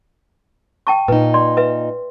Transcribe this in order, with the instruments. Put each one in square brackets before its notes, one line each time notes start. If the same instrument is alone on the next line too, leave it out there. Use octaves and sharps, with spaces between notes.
[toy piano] G5 A5 C#6
[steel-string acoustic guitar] A#2 D#4 [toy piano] B4
[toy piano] D5 C6
B4 E5